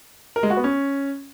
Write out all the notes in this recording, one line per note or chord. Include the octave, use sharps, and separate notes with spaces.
A#4
G#3
F#4
B3
C#4